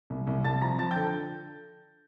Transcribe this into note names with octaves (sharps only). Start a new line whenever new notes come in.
C2
C2
C2 A5 A6
F3 A#5 A#6
F3 A5 A6
D3 G5 G6